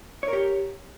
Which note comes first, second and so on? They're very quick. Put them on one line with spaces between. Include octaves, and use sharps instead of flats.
C#5 A#4 G4